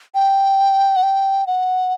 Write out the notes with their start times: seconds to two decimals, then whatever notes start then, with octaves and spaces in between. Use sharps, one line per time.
0.15 G5
0.96 F#5
1.03 G5
1.47 F#5